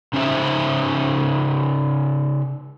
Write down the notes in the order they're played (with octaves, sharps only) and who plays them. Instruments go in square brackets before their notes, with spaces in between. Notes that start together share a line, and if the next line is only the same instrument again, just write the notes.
[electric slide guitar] C#3 C#4 D#4 C5 E5